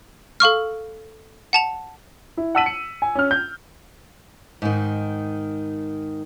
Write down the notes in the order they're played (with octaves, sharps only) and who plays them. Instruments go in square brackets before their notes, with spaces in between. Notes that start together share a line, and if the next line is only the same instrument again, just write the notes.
[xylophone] A4 F5 C#6 F6
F#5 A5 F7
[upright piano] E4
F#5 A5 E6 B6 D#7 F#7
C#7
G#5
C#4 F6
G6
[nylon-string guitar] G#2 D#3